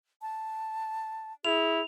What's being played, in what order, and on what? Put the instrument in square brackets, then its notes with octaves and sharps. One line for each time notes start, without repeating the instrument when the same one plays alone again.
[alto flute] A5
[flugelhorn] E4 [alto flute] G#4 [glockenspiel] F7